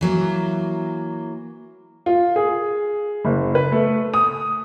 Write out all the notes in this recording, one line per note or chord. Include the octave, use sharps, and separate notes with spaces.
E3 F#3 A#3
F4
G#4
F#1
B4
A3
D#6